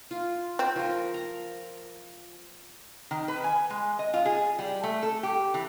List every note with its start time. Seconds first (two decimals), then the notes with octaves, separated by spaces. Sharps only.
0.11 F4
0.59 C4
0.76 F3 A#4
1.14 A#5
3.11 D#3
3.28 B4
3.44 G#5
3.70 G#3
3.99 D#5
4.14 F4
4.26 G#4
4.59 G3
4.83 A3
5.03 A4
5.23 G4
5.54 E3